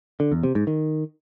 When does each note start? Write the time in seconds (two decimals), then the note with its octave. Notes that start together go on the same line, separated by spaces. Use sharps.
0.20 D3
0.32 E2
0.43 C3
0.55 G#2
0.67 D#3